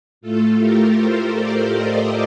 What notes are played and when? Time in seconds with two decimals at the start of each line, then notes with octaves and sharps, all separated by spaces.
0.21 A2 A3 F4 A4
0.59 G4 A#4
0.96 A4 C5
1.33 A#4 D5
1.71 C5 D#5